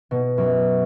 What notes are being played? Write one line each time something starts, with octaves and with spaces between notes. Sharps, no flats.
B2
F#2